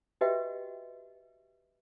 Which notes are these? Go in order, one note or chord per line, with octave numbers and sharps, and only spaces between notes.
F#4 G4 B4 D#5 E5 G5